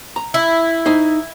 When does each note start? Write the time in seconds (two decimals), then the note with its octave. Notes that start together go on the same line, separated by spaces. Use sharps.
0.16 A#5
0.34 E4
0.86 D#4 C5